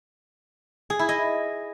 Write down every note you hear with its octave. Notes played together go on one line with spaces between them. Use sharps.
G#4
E4
D#5